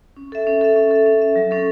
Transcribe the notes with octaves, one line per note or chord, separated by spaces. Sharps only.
C#4
A4 E5
C#4
A4 E5
C#4
A4 E5
C#4
A4 E5
F#3
C#4 A4